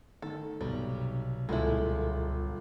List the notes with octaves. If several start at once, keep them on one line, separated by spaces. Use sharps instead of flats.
D#3 A4
B1 C3 G3
G1 C#2 A#2 G#3 E4 A4